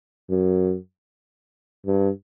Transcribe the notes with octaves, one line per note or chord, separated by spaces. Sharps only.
F#2
G2